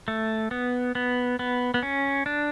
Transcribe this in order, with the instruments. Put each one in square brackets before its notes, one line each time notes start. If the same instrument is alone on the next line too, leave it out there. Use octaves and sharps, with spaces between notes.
[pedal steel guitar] A3
B3
B3
B3
B3
C#4
D4